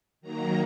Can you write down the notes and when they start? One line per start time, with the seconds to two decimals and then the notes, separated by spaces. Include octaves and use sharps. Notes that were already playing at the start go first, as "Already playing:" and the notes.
0.21 D#3 F#3 A#3 A#5